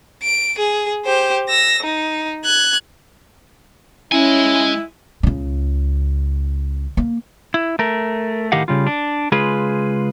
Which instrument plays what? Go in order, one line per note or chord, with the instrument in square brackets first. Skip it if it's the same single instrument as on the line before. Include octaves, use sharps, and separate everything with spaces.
[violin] D7
G#4
G4 C5
E6 A#6
D#4
F#6 G#6
[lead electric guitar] G#3 G#5 [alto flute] C#4 [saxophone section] E4
[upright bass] C#2 C#3
A#3
[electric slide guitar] E4
A3 A#4
A2 D#3 G4 D#5 F5 F#5
C#3 G3 F4
D4
C#3 G#3 F4 G#4 B4